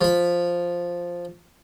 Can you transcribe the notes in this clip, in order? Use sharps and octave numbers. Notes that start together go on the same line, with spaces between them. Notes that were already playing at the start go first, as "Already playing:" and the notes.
F3 B5